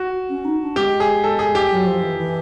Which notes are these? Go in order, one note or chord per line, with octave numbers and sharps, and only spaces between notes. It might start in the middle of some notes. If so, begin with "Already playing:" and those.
Already playing: F#4
C#4
D#4
D4
G#3 G4
G#4
A4
G#4
G4
F#3
F3
E3
E3